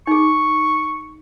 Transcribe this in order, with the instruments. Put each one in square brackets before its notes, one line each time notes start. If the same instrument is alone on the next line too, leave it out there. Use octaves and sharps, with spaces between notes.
[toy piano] D#4 G#4 [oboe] C#6